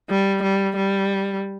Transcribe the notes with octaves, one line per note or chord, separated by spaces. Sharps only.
G3
G3
G3